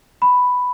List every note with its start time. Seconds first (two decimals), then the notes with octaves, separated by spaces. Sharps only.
0.22 B5